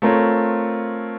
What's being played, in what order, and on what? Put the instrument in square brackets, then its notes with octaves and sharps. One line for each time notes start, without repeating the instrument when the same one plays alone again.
[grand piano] A3 C4 F4 A#4 C#5